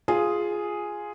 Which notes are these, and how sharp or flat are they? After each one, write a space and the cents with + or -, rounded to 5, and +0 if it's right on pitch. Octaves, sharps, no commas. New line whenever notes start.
F4 +0 G#4 +0